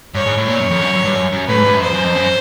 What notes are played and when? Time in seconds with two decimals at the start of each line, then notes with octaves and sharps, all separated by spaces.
0.14 G2 C#5
0.26 G#2
0.37 A2
0.48 A#2 C#5
0.59 F#2
0.70 F2
0.82 F#2
0.93 F#2
1.04 G2
1.15 F#2
1.32 F#2
1.48 A2 B4
1.57 G#2
1.65 G2
1.74 F#2
1.82 F2 C5
1.94 F#2
2.04 F2
2.16 F#2